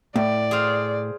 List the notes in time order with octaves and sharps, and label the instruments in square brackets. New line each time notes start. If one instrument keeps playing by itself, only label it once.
[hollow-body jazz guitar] A2 [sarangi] D5
[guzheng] G#4 C5 F5